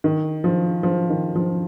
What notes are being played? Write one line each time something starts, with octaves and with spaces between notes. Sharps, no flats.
D#3
F3
F3
D#3
F3